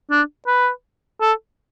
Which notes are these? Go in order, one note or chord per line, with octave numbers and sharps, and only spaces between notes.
D4
B4
A4